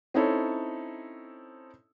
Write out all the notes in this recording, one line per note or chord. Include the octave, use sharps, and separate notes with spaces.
C4 C#4 D#4 E4 A4 C#5